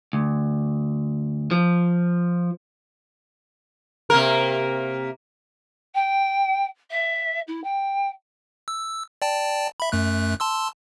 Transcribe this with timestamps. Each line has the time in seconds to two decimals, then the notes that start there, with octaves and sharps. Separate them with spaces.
0.13 D2
1.51 F3
4.10 C3 A#3 A#4
5.94 G5
6.90 E5
7.47 E4
7.63 G5
8.68 E6
9.22 D5 G5 A5
9.80 E5 B5
9.92 F#2 A3 F#6
10.40 A5 C6 E6